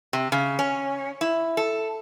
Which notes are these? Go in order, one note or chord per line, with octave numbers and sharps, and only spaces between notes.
C3
C#3
C#4
E4
A4